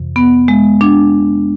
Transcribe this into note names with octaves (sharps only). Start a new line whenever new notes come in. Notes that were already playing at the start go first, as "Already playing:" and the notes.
Already playing: F2 C3 E3
B3
G#3
D4